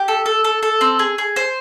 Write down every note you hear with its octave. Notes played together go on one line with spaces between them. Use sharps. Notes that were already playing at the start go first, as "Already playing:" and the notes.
Already playing: G4
A4
A4
A4
A4
C4
G#4
G#4
C5